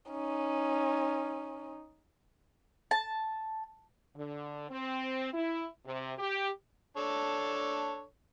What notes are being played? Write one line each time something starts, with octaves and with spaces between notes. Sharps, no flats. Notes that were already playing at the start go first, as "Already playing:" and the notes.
C#4 D#4
A5
D3
C4
E4
C3
G4
D4 A4 C#5